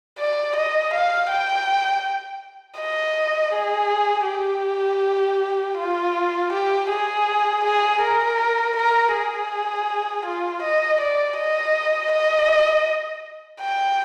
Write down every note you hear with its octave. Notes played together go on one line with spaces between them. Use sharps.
D5
D#5
F5
G5
D#5
G#4
G4
F4
G4
G#4
G#4
A#4
A#4
G#4
F4
D#5
D5
D#5
D#5
G5